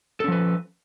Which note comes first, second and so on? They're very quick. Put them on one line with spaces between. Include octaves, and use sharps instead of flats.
A4 C#4 F3 B4